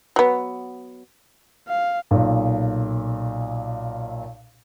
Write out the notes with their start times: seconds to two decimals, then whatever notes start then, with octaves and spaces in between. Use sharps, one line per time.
0.16 F#3 B3
1.68 F5
2.11 B1 A#2